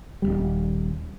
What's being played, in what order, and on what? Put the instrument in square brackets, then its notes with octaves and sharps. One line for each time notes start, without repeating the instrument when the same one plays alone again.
[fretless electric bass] D#1 C2 G3